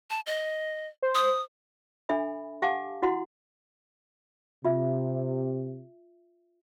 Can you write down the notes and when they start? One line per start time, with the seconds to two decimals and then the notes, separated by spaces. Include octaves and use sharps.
0.10 A5
0.26 D#5
1.02 C5
1.15 D#6
2.09 D4 A4 E5 G#5 B5
2.62 G4 F5 F#5 G#5 A5 D6
3.02 E4 F#4 F#5 C6
4.65 C3 F4 E5